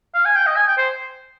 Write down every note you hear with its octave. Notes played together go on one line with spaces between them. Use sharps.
F5
G#5
G5
D#5
G#5
G5
C5